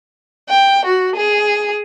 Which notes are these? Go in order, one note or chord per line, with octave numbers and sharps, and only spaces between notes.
G5
F#4
G#4